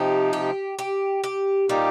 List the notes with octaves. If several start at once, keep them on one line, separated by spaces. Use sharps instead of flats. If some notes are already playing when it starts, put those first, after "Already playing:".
Already playing: C3 F3 D#4 G4
G4
G4
G4
A#2 G3 A#3 D#4 G4